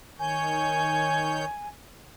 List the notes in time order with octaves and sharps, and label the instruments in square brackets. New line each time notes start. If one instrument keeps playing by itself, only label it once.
[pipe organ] D#3 C#5 G6 [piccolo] G#5